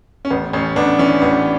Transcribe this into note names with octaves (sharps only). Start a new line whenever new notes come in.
C#4
A1 B3
A1 C#4
A1 B3 D4
E3 C#4
A1 B3